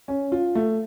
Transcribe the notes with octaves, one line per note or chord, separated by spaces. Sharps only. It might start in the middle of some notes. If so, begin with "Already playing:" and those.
C#4
F4
A3